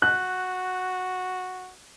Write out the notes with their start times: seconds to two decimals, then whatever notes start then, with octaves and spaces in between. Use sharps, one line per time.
0.02 F#4 F#6